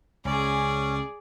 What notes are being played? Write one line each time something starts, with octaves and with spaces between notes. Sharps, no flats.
C#2 C#4 G#4 D5